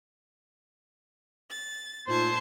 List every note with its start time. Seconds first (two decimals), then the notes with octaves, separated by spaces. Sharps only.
1.50 A6
2.08 A#2 A3 D#4 F4 C5 A5 G#6